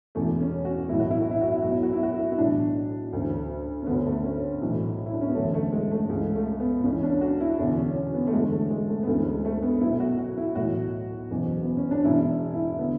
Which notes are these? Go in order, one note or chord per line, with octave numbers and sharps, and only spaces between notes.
E1 E2 C#3 E3 A3
C#4
F#4
B1 A2 E3 E4
F#4
E4
F#4
E4
F#4
E4
B1 B2 F#4
E4
F#4
E4
F#4
E4
E4
B1 A2 E3 D4
D2 C#3 E3
C#4
D2 D3 B3
A3
C#4
B1 A2 E3
E4
D4
C#4
B3
F#1 E2 D3 A3
A3
G#3
A3
C#2 C#3 E3 G#3
A3
B3
C#2 C#3 E3 C#4
C#4
D4
F#4
E4
E1 E2 D3 D4
C#4
C#4
B3
A3
F#1 E2 D3 G#3
A3
G#3
A3
B3
D2 C#3 E3 A3
G#3
A3
B3
B1 B2 E4
F#4
F#4
E4
B1 A2 E3 F#4
F#1 E2 B2
B3
C#4
D4
E1 E2 C#3 E4
E4
D3 B3